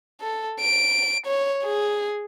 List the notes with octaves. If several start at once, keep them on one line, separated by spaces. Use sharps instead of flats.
A4
D7
C#5
G#4